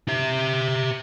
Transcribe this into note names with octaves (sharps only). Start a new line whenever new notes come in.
G4 E5